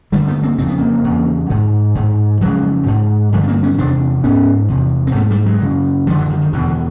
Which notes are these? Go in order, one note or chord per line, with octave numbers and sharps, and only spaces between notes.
G2 D3 G3 A3
A3 B3
A#3 C4
F2 C#3 C4
B3
A#3 C4
E2 C#3
G#2
G#2
F2 C#3 F#3 G#3
G#2
G2 D3 F3 G3
B3
A#3 C4
B3 C#4
E2 C3 C4 D4
G#2 B3 C#4
E2 C3
C4
G#2 A3 B3
G3 A3
F#3 G#3
F#2 C#3
F#2 D3 F3 G3
E3 F#3
D#3
D#3
E2 B2 D3
D3